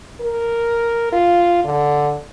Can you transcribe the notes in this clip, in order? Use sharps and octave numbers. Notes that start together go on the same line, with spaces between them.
A#4
F4
D3